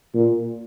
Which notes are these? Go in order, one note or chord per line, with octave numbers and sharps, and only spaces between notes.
A#2